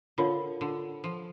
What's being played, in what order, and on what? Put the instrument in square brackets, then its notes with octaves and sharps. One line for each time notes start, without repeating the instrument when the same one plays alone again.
[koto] D3 [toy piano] F4 A#4 C#5 F5
[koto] D3
F3